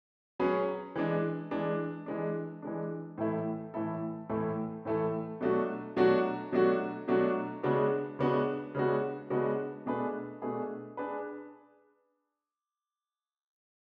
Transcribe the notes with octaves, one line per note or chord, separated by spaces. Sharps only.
F#3 C#4 G#4 B4
E3 G#3 D4
E3 G#3 D4
E3 G#3 D4
E3 G#3 D4
A2 E3 A3 E4 A4
A2 E3 A3 E4 A4
A2 E3 A3 E4 A4
A2 E3 A3 E4 A4
B2 F#3 A3 D4 F#4
B2 F#3 A3 D4 F#4
B2 F#3 A3 D4 F#4
B2 F#3 A3 D4 F#4
C#3 G#3 B3 D4 F#4
C#3 G#3 B3 D4 F#4
C#3 G#3 B3 D4 F#4
C#3 G#3 B3 D4 F#4
B2 A3 D4 G#4 B4
B2 A3 D4 G#4 B4
D4 G#4 B4